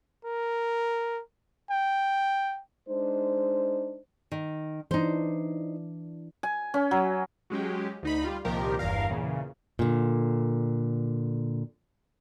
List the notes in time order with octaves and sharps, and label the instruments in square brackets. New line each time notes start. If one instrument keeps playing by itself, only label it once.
[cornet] A#4
G5
[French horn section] G#3 D4 D#4 C5
[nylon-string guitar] D#3
[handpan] E3 D4 [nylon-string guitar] D#4 C5
[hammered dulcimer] G#5
C#4
F#3
[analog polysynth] F#3 G#3 C#4 G4
D2 D#4 B5
G3 F4
C2 A#2 D#3 F3 G4 A#4
G1 E2 G2 A#4 F5
E2 A#2 C#3
[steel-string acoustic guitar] A#2 D3